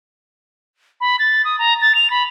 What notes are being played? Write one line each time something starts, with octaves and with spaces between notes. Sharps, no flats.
B5
A6
D#6
A#5
A6
F7
B5